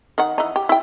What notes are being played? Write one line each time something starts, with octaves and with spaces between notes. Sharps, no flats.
D#3 F#5
E3 D#4
G4
E4 G5